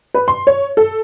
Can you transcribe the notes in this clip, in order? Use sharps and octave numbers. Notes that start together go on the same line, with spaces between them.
B4
C6
C#5
A4